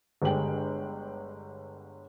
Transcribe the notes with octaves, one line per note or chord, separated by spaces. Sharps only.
G1 D3 G#3 G4 G5 F#7